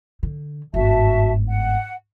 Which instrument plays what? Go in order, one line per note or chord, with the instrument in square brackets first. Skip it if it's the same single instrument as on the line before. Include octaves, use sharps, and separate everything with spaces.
[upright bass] D3
[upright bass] G1 G#2 [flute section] F#4 E5 A5
[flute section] F#5